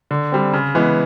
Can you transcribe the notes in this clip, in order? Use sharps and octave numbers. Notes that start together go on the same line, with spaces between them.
D3
G3 C4
C#3
E3 G#3 B3